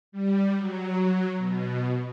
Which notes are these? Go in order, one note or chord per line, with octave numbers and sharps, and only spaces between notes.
G3
F#3
B2